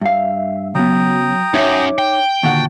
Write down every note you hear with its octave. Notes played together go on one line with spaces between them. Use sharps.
G2 E5 F5
C#3 F#3 B3 G5 A#5 D#6
F#2 D#4 C#5 E5 D6
G5
D#2 A#2 D3 F#4 F#5 A5